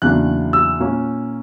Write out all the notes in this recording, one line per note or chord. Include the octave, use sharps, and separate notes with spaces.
E2 C#3 F#3 A#3 D4 F#6
E6
A#2 A#3 C#4